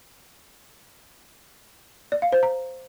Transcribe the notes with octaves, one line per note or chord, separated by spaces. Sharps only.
D5
F5
C5
A#5